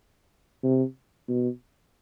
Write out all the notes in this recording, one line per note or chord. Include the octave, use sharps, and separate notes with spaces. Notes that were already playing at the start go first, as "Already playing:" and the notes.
C3
B2